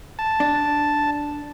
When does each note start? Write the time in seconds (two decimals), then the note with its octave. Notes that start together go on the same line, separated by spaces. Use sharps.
0.19 A5
0.40 D4